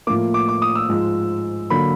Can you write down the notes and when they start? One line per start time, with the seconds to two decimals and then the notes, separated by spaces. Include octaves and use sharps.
0.07 A2 F3 A#3 D6
0.34 D6
0.49 D6
0.62 D#6
0.75 E6
0.89 G#2 F3 G#3
1.70 D3 F#3 A#3 B5